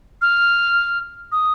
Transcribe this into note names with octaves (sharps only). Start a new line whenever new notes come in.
F6
D#6